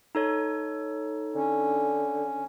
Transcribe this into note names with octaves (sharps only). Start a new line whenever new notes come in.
D#4 A4 C#5
D3 C#4